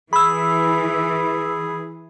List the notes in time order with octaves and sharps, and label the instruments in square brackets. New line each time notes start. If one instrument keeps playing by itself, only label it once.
[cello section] E3 [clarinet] G#4 [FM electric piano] B5 E6